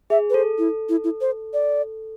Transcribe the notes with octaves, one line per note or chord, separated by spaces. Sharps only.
G#4 E5
B4
A4 C5
E4
E4
E4
C5
D5